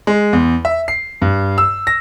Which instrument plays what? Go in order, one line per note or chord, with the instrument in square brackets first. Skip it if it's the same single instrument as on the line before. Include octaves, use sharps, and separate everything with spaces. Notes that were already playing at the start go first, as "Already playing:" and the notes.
[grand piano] G#3
E2
E5
C7
G2
E6
A#6